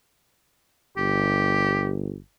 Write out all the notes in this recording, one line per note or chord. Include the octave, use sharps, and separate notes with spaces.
G1 G4